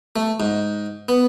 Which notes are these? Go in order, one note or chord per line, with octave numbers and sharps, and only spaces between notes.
A3
G#2
B3